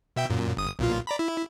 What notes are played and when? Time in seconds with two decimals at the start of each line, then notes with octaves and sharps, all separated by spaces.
0.16 B2 E5 G5
0.30 F#2 A#2
0.57 G1 D#6
0.79 B1 A#2 F4
1.07 D5 A#5 B5
1.19 E4